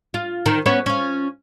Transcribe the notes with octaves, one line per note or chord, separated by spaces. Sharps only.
F4
D#3
B3 C#4 C#5
C#4 F4